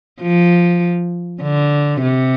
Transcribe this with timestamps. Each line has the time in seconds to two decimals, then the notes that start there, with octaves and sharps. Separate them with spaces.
0.21 F3
1.42 D3
2.02 C3